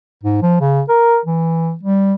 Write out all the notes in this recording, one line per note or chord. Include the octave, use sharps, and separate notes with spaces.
G#2
F3
C#3
A#4
E3
G3